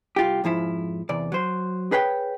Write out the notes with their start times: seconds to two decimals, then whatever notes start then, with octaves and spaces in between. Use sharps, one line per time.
0.16 C2 F4 G4
0.44 F2 G#2 F3 E4
1.09 E2 C3 D5
1.32 F#3 C5
1.92 G#4 B4 C#5 G5